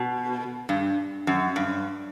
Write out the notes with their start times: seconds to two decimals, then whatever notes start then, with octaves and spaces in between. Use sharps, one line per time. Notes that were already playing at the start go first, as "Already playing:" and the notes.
Already playing: B2
0.69 G2
1.27 F#2
1.56 G2